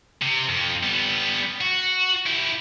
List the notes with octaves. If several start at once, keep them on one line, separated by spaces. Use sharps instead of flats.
C3
F2
G3 B3
F#4
E4 G4